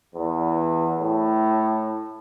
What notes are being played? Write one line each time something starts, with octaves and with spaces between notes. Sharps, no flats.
E2
A2